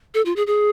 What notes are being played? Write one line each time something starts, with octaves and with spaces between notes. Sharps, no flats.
A4
F4
G#4
G#4